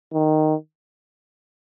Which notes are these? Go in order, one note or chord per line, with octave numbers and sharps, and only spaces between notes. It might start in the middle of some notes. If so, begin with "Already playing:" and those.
D#3